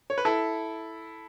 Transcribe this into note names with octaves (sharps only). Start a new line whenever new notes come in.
C#5
B4
E4 A4